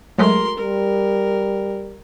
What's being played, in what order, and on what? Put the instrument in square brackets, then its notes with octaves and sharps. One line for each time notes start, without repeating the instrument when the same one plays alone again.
[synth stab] F#3 G#3 A3 [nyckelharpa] A#4 C6
[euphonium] G3 [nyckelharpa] A#4